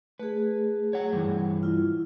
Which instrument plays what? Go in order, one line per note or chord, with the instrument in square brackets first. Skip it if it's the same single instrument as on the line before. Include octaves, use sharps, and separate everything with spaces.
[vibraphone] A3 G#4 [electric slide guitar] B4
[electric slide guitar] C#5 F#5
G2 E3
[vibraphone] E4 F4